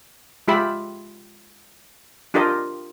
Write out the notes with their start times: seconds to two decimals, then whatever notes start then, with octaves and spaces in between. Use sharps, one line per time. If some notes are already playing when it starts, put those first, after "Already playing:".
0.48 G#3 F4 G4 E5 B5
2.34 D4 F4 G4 A#4 D#5